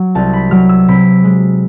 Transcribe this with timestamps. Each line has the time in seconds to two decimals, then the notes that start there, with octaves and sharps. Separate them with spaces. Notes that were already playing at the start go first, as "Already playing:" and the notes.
Already playing: F#3
0.15 C2 A5
0.33 B5
0.51 F#3 F6
0.69 E6
0.88 C3 B5
1.24 G#3